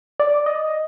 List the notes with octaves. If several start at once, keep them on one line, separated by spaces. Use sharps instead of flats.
D5
D#5